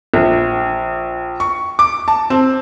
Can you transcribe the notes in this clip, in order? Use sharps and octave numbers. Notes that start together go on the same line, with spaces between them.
A#1
C#6
D6
A5
C4